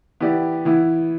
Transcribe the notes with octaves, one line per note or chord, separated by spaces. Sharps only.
E3 B3 E4 G4 D5
E3 B3 E4